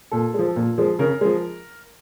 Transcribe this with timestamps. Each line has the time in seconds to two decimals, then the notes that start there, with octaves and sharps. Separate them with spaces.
0.11 A#2 A4
0.34 F3 G#3
0.56 A#2
0.78 F3 G#3
0.99 C#3 A#4
1.21 F3 G#3